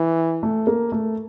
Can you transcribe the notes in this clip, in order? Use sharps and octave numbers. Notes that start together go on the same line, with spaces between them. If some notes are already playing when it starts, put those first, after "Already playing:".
Already playing: E3
A3
A#3
A3